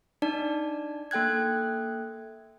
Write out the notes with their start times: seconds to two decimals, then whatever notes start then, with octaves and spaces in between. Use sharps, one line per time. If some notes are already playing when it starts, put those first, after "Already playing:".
0.22 D4 D#4 D5 A5
1.11 A#3 A4 G5 F#6 G#6